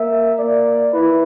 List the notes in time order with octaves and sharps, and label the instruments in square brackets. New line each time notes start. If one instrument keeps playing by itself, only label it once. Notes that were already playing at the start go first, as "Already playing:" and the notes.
Already playing: [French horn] A#3 [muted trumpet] E5
[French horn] A#3 [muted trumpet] D5
[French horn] E4 [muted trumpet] B4